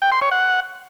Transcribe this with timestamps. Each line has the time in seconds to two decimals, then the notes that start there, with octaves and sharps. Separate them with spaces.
0.02 G5
0.12 C6
0.22 C#5
0.31 F#5